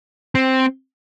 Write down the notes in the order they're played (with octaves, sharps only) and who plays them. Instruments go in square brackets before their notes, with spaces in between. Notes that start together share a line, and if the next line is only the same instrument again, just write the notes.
[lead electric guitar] C4